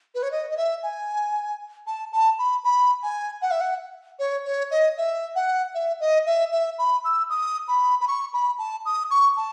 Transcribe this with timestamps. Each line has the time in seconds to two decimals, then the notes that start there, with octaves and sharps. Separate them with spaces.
0.15 B4
0.23 C#5
0.32 D#5
0.50 D#5
0.57 E5
0.83 G#5
1.87 A5
2.12 A5
2.39 B5
2.64 B5
3.03 G#5
3.42 F#5
3.51 E5
3.61 F#5
4.19 C#5
4.45 C#5
4.71 D#5
4.98 E5
5.35 F#5
5.75 E5
6.00 D#5
6.27 E5
6.52 E5
6.79 B5
7.04 E6
7.30 D#6
7.68 B5
8.01 B5
8.08 C#6
8.33 B5
8.58 A5
8.85 D#6
9.11 C#6
9.37 A5